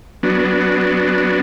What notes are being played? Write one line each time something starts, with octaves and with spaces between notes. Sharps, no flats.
F#3 B3 D4